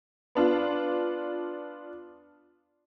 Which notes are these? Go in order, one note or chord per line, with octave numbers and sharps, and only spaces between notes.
B3 D4 F4